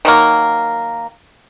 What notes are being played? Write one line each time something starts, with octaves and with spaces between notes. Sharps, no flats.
D#3 F#3 A#3